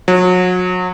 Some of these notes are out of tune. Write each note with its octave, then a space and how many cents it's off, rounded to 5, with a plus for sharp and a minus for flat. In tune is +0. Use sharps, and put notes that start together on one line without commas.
F#3 -30